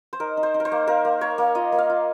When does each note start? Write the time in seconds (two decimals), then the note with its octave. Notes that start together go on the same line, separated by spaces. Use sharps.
0.13 C5
0.20 D#4 A#4
0.37 D#4
0.43 C5
0.54 D#4
0.60 A#4
0.65 C5
0.72 A#3
0.87 A#3 A#4
1.05 A#3
1.21 A#3 C#5
1.38 A#3
1.55 F4 D#5
1.72 A#3
1.78 F5
1.90 F4